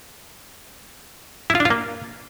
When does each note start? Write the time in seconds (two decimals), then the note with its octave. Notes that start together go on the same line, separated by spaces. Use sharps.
1.50 E4
1.55 F4
1.60 D4
1.65 F4
1.70 A#3